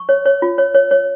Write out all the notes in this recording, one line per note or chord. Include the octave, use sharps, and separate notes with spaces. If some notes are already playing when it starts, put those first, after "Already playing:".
Already playing: C#6
C#5
C#5
F4
C#5
C#5
C#5